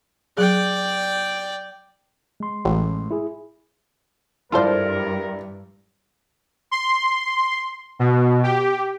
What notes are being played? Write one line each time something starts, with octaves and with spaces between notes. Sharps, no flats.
F#3 G#4 D5 G5
G#3 C6
A1
E4 G#4
G2 E4 F4 A4 A#4 C5 D5
C6
B2
G4